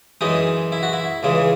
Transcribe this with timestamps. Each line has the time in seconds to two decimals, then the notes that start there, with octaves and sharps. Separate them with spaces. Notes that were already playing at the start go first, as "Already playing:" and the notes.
0.21 F#2 E3 G#3 D#4
0.72 E4
0.83 F#4
0.93 E4
1.23 C#2 C#3 E3 G#3